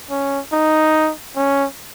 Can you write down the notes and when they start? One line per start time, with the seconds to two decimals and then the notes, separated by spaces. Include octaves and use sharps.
0.10 C#4
0.52 D#4
1.36 C#4